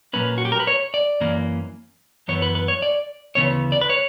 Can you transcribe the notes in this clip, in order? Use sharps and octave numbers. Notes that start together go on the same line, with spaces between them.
A#2 F#3 A#3 C#4 B4
F#4
G4
A#4
B4
C#5
D5
F#2 E3 A#3 C#4
F#2 E3 B3 C#5
B4
B4
C#5
D5
D2 C#3 E3 B3 C#5
D5
B4
C#5